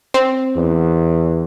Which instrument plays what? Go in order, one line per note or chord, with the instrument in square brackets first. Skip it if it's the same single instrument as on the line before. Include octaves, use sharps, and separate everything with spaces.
[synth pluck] C4
[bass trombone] E2